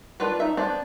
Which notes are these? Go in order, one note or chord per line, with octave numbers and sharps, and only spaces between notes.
D4 F4 A#4 B4
D#4 E5
B3 C4 D4